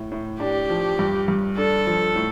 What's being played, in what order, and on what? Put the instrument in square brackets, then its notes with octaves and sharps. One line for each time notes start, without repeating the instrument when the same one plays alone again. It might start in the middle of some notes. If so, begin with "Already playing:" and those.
Already playing: [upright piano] A2
A2
[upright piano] D4 [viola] G4
[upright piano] F3
G2
G2
[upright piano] D4 [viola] A4
[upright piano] F3
A2